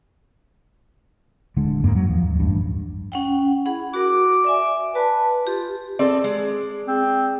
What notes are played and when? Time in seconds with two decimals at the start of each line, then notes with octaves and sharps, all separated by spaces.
1.57 D1 D3 G#3
1.83 F2 G#2 A#3
1.95 F#3
2.09 D#2 F3
2.23 D#2
2.39 A1 G2
3.12 C#4 F#5 G5
3.65 E4 G#4 F#5 B5
3.94 F#4 A#4 D6
4.44 D5 E5 G#5
4.95 B4 A5
5.47 F4 G4
5.99 C4 G#4 A4 D5
6.24 G#3
6.87 C4 G#4